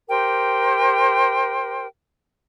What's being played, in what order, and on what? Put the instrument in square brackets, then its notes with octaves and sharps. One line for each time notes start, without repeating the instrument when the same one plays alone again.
[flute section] G4 A#4 C5 G5